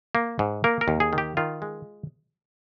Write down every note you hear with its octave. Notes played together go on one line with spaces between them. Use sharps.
A#3
G#2
A#3 A#4
A#4
D#2
G#4
D#3
G4
D#3 F4
G#3